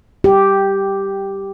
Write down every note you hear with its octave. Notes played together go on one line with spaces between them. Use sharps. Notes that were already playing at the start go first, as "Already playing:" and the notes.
G4